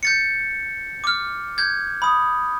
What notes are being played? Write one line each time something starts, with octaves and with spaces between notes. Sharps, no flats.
G6 A6 C#7
D6 F6
G6 G#6
B5 D#6